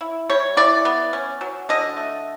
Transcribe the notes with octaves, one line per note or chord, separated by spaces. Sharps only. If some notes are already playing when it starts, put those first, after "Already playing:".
E4
G3 C#5
E3 D5
B3
C#4
F#3
D3 D#5
A3